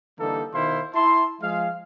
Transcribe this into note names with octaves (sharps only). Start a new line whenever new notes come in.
D3 E3 G3 A#3 D#4 A4
B2 D#3 E4 C5 F5 C6
E4 E5 A5 C6
F3 G#3 G#4 F5